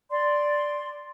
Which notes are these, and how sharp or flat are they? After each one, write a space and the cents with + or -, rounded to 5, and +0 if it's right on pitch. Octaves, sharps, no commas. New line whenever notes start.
D5 +0 C6 +0